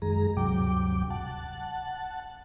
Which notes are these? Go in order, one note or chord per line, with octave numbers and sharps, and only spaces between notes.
F#2 D#3 G#3 G#4 A#5
D2 G2 C3 F#3 G5 D6
F#5 A5